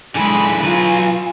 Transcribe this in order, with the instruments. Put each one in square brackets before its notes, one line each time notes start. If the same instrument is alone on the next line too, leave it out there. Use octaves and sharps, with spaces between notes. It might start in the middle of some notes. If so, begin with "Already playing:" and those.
[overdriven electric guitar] D3 E3 [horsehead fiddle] G#3 B5 [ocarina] G#5
[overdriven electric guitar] F#3 B4 [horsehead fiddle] F4